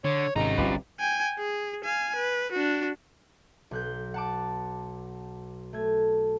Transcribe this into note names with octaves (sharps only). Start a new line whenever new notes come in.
D3 C#5
G#1 C3 C#4 D#4 A#5
G1 C2 C4 F4 G4 B4
G5 G#5
G#4
F5 G#5
B4
D4 F#4
B1 F#6 G6
F#5 A5 D6
A3 G#6